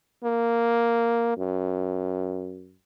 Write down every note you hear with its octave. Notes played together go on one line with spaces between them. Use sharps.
A#3
F#2